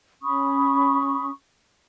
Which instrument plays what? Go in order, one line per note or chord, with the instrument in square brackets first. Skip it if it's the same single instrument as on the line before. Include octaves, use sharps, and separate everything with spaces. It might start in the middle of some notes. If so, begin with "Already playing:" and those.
[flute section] C#4 B5 C#6 D#6